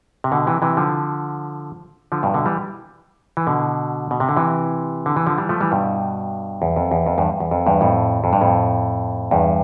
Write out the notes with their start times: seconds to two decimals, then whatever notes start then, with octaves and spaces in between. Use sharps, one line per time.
0.24 C3
0.32 B2 D3
0.47 C3 E3
0.62 C3 E3
0.77 D3 F3
2.12 D3 F3
2.23 G2 B2
2.34 B2 D3
2.46 E3 G3
3.37 E3
3.47 B2 D3
4.11 B2
4.20 C3
4.29 D3
4.36 C3 E3
5.06 D3
5.16 E3
5.27 D3 F3
5.38 E3 G3
5.49 F3 A3
5.61 E3 G3
5.71 G2 B2
6.62 E2
6.76 F2
6.91 E2
7.06 F2
7.18 E2 G2
7.40 E2
7.51 F2
7.67 E2 G2
7.81 F2 A2
8.24 F2
8.33 G2
8.41 F2 A2
9.31 E2 G2